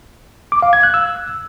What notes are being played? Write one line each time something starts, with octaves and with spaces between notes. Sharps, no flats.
D6
F5
G#6
F#6
E6